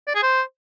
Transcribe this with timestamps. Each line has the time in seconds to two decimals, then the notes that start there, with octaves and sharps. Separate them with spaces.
0.07 D5
0.15 G#4
0.23 C5